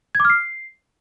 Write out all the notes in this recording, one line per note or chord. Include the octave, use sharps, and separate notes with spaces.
G#6
D6
F6
C7